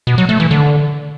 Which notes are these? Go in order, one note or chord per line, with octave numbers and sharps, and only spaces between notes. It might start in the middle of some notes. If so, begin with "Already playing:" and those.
B2
F#3
A3
E3
D3